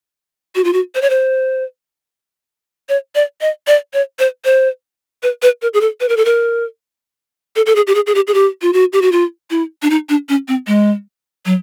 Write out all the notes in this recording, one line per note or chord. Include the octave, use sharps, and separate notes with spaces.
F#4
F4
F#4
C5
C#5
C5
C#5
D5
D#5
D5
C#5
C5
C5
B4
B4
A#4
G#4
A4
B4
A#4
A4
A#4
A4
A4
G#4
G4
G#4
G#4
G4
G#4
G4
F4
F#4
G4
F#4
F4
E4
D4
D#4
D4
C#4
C4
G#3
F#3